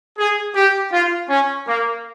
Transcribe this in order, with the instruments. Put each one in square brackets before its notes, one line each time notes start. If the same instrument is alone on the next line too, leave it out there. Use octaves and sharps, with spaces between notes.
[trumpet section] G#4
G4
F4
C#4
A#3